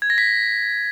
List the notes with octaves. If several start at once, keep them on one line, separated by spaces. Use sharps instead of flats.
G#6
A#6
B6